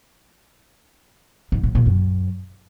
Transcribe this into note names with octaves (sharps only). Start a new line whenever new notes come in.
G#2
A2
A#2
F#2